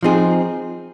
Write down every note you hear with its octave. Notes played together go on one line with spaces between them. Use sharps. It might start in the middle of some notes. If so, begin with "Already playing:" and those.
F3 C4 D#4 G#4